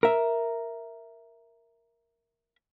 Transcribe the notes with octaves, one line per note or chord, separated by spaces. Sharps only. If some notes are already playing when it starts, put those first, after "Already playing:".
A#4 E5